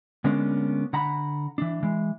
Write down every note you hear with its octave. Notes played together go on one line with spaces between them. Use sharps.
D3 G#3 A#3 B3 C#4 D4
D3 F#5 A#5 B5
E3 D4
E3 G#3